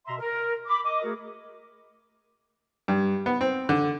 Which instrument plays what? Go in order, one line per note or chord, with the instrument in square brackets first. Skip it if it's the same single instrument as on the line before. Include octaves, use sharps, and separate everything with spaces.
[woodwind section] B2 E5 A#5 C6
A#4
B5 D6
D#5 D6
A3 F#4 G#4 A#4
[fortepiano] G2
B3
C4
D3